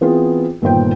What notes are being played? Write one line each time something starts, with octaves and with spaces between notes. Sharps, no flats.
E3 B3 C4 F4 G#4
G1 A#2 D#3 C5 G5